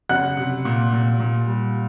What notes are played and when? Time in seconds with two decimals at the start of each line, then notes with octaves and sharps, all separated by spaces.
0.09 F#1 F#5 F#6
0.37 C3
0.65 A#2
0.93 A#2
1.20 A#2
1.47 G3